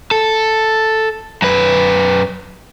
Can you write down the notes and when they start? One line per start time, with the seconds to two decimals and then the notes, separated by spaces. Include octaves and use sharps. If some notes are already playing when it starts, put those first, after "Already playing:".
0.11 A4
1.42 F#2 B4